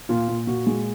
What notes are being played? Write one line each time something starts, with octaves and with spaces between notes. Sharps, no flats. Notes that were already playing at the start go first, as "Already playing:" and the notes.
A#2 F4
A#2
A#2 F#4
G#3